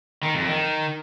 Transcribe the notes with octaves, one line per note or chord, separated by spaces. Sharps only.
D#3
F2
D#3